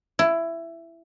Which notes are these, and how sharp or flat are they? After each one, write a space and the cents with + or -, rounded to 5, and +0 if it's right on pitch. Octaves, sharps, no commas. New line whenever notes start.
E4 +15